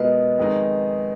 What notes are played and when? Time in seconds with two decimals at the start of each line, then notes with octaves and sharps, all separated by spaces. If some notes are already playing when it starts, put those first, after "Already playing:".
Already playing: B2 G#3 B3 F4 A#4 B4 D#5
0.38 F2 D#3 G#3 D#4